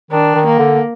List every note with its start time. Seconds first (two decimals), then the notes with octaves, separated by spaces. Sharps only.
0.11 D#3 D4
0.35 D#3
0.47 A#3
0.59 D3